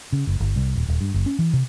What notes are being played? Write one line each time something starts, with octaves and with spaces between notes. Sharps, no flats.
C#3
F#1
G1
C2
D#1
D#1
G2
F#1
C#4
E3
C3